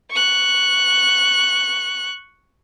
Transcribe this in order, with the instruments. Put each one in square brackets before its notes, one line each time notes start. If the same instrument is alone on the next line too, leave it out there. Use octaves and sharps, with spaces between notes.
[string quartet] C#6 F#6